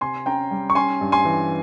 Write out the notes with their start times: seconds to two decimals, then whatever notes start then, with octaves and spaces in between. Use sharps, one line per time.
0.01 C3 G#5 C6
0.26 C#4 G5 A#5
0.51 G3
0.70 C#6
0.75 C#4 G#5 C6
1.01 G2
1.12 G#5 C6
1.25 E3